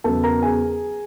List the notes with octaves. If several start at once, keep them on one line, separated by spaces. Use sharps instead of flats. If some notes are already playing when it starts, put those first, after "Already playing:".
E2 C#3 F#3 A4 A5
A#4 A#5
G#4 G#5